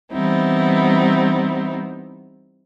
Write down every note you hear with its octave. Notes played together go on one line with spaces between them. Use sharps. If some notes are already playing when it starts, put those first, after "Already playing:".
E3 G3 B3 C4 D#4 E4